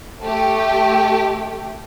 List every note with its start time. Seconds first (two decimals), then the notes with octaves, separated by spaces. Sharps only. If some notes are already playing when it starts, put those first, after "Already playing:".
0.21 A3 G4